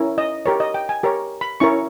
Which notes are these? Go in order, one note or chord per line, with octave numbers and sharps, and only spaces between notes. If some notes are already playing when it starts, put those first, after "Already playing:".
Already playing: C#4 E4 A#4 C#5
D#5
G4 A#4 C#5
D#5
G5
G#5
G4 A#4 C#5
B5
C#4 E4 A#4 C#5 C#6